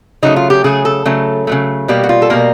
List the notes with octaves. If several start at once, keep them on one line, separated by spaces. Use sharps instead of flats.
C#3 F#3 A3 D#4
F4
G4
C#3 F#3 A3 G#4
A4
C#3 F#3 A3
C#3 F#3 A3
B2 G3 A#3 G4
F#4
F4
A4
B2 G3 A#3 A#4